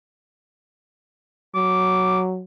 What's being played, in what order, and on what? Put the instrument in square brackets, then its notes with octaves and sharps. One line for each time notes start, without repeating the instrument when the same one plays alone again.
[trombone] F#3 [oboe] D6